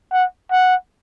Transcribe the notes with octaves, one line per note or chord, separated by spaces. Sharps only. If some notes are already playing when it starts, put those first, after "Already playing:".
F#5
F#5